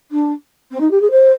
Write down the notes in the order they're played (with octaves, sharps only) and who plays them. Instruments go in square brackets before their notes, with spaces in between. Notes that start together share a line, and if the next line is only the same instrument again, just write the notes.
[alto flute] D4
C4
D#4
G4
G#4
C5